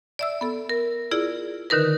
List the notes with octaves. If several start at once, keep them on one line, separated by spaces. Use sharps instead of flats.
D5 E5 E6
B3 A4
A#4
E4 F4 G#4 D5
D3 D#3 D#4 A#4 B4